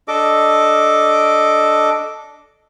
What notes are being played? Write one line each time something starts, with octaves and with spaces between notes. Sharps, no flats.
D4 A4 D#5 D6